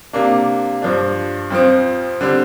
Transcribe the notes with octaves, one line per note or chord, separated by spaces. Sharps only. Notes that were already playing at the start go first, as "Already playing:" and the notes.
C3 A#3 D4
G2 F3 D4
F2 F3 C4
D3 G3 C4